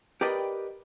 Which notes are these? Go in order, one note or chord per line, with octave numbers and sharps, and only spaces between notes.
G4 A#4 B4 D5 D#5 G5